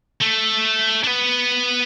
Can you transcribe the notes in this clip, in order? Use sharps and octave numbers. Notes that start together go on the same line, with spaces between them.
A3
D4
B3